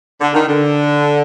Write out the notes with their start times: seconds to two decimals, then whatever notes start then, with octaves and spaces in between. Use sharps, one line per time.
0.21 D3
0.34 D#3
0.48 D3